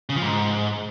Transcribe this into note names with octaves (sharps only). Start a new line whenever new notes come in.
C#3
F3
G#2